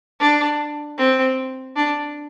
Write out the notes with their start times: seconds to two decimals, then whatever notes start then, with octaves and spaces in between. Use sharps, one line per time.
0.20 D4
0.98 C4
1.76 D4